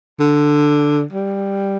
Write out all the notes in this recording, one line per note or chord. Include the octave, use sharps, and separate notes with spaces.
D3
G3